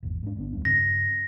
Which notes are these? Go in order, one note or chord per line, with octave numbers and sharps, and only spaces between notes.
G#1 E2 E3
G#2 D4
G1 B3 D4
D#2 G3 D4
G2 C#3 C4 A#6